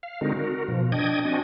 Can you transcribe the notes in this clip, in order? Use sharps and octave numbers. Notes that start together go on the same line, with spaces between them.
F5
D3 G#3 C4 D#4 F#4 A#4
F#4 A#4
B2 F3
D4 D#5 G5 D#6 G#6
C4 D4 F#4 D#5 G#5